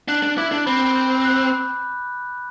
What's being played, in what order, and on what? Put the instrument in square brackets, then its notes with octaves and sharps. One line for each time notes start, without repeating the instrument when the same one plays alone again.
[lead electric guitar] D4 [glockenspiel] F#6
[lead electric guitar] D4
[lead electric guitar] E4 [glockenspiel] D6
[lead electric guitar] D4
[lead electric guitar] C4 [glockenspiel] B5
[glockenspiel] G6
F#6